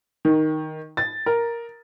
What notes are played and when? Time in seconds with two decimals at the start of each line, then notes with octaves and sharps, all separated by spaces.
0.25 D#3
0.97 A6
1.26 A#4